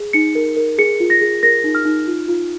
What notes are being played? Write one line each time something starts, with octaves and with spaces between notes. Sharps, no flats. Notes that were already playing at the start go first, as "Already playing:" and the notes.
Already playing: G#4
D#4 C#7
A#4
A#4
G#4 C#7
F4
A#6
G#4
A#4 A#6
D#4
F6
D#4
F4
F4